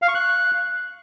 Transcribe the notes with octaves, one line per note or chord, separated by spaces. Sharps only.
F5
C#6
F#6